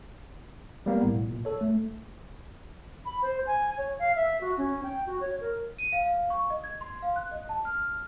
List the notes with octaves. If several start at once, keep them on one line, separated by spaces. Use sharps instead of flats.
G3 A#3 B3
B1 A2
A#2
A4 C#5
A3
B5
C5
G#5
C#5
F5
E5
F#4
C#4
G5
F#4
C#5
A#4
D#7
F5
F5
C#6
D#5
G#6
C6
F5
F#6
D#5
A5
F6